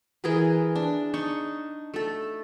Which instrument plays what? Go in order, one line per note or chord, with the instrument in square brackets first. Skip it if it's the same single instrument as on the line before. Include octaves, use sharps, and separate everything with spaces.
[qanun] E3 G#4 A#4 B4
D4
D4 D#4 C#6
A3 A4